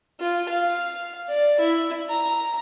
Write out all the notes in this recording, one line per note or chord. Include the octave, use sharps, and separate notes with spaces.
F4
F5
D5
E4
A#5